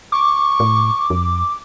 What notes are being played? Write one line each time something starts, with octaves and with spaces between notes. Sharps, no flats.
C#6 D6
A2
F2